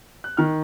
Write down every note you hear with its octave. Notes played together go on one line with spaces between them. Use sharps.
F#6
D#3 F6